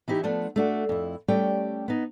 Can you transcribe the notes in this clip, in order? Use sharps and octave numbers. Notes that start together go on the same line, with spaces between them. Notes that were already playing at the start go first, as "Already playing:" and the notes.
E3 D#4 E4 G4 E5
F3 A3 B3 D4
A3 D4 F#4
F2 E4
G3 A3 C#4 G4 D5 G5
B3 D#4